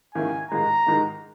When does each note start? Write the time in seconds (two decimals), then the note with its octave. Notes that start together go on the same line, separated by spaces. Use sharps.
0.14 G#2 D#3 A#3 C#4 E4 G#5
0.51 G#2 D#3 G#3 A#5
0.87 G#2 D#3 G#3